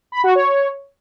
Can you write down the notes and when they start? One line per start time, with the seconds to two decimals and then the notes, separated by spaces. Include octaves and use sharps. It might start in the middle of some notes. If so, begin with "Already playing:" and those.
0.12 B5
0.24 F#4
0.35 C#5